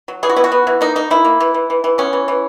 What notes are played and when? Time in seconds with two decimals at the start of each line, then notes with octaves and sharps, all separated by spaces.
0.08 F#3
0.23 E3 G#4
0.30 F#4
0.36 B3 E4
0.44 F#4
0.52 B3
0.67 E3
0.81 A#3 D#4
0.96 A#3 D#4
1.10 A#3 E4
1.25 A#3
1.40 E3
1.54 E3
1.70 E3
1.84 E3
1.98 B3 C#4
2.13 E3
2.28 E3